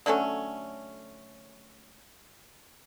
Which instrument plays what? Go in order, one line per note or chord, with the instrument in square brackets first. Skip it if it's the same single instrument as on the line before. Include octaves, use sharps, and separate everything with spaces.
[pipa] D3 F#3 A3 C#4